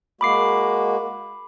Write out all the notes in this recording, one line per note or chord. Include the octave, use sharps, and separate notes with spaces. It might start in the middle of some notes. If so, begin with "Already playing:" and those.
G#3 A#3 F#4 B5 D6 C7